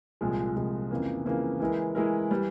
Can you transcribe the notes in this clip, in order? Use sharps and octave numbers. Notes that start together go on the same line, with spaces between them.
C2 A#2 F3 G#3
C2 A#2 F3 G#3
F2 C#3 E3 A#3
F2 C#3 E3 A#3
E3 G#3 E4 A#4
E3 G#3 E4 A#4
E3 G3